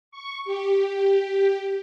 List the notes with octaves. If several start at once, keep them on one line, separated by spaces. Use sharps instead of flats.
C#6
G4